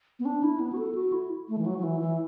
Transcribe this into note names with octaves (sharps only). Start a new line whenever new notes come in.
B3
D4
E4
B3
F#4
A4
F#4
E4
A3
E3
F#3
F#3
E3
E3